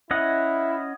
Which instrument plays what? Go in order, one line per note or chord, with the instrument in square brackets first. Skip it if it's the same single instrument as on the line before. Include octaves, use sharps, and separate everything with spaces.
[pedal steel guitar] C#4 D#5 F#5 [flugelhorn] E4